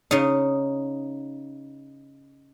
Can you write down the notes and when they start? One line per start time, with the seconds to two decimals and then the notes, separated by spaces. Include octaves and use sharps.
0.11 C#3 D#4